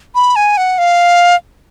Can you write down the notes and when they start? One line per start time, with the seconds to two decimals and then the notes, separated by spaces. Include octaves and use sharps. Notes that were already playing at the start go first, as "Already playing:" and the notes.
0.15 B5
0.36 G#5
0.57 F#5
0.78 F5